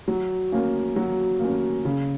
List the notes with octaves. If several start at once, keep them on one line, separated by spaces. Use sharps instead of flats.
F#3
A#3 C#4
F#3
A#3
C#4
C#3